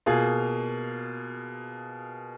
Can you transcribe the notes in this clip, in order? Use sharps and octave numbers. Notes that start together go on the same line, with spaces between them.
B2 A#3 F4 G#4